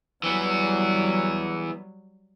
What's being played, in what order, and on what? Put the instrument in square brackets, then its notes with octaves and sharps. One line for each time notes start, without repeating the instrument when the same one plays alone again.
[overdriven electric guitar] E3 B3 [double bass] F#3 G3